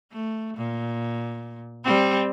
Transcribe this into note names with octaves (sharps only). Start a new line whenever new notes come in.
A3
A#2
G3 C4